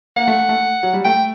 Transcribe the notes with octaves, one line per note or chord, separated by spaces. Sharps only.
A#3 F#5
A3
A3
F#3
G3
A3 G5